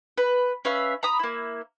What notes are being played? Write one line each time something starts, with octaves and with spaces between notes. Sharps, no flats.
B4
C#4 B4 E5 F5
A#5 B5 D#6
A#3 E4